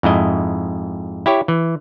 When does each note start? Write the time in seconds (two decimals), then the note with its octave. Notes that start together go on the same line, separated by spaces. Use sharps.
0.03 F2 G#2 E4 D#5
1.26 E4 G4 C#5
1.48 E3